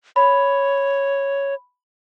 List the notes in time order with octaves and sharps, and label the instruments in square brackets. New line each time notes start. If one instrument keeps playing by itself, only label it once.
[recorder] C#5 [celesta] B5